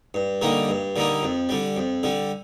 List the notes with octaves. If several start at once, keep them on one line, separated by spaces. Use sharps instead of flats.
G2
D3 G3 A#3 D#4
G2
D3 G3 A#3 D#4
F2
D3 G3
F2
D3 G3